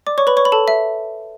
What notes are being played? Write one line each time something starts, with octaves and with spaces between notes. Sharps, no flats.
D5 D6
C#5 C#6
B4 B5
C#5 C#6
B5
A4 A5
E5